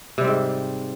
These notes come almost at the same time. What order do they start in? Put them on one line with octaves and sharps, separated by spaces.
C3 G3 C4 G#2